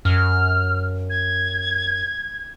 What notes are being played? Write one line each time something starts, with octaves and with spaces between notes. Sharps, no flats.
F#2 F6
G#6